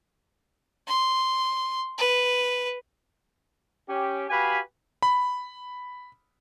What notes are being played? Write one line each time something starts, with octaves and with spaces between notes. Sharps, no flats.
C6
B4
C#4 G4
F#4 G4 B4 F5 G#5 B5
B5